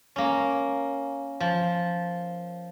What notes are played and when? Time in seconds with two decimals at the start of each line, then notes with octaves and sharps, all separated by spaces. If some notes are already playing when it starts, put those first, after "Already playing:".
0.16 A#3 C#4
1.40 F3